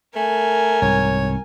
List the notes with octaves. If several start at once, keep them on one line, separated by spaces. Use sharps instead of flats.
A3 A#4 G#5
C2 G#2 C#5